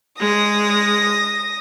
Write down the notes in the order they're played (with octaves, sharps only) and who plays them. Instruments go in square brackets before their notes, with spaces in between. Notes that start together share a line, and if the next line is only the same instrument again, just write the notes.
[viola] G#3 [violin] D#6 A#6